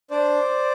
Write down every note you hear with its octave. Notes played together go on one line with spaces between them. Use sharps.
D4 C5 D5